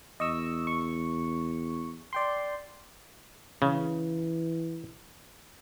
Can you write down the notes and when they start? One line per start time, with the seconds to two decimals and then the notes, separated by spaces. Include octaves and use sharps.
0.20 E2 D#5 C#6 E6
0.67 C#6
2.13 D5 G5 C6
3.62 C#3 E3